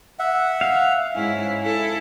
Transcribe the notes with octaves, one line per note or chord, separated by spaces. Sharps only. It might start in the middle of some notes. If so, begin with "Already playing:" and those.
E5 F#5
F5
G#2 C#4 E4
E4 A4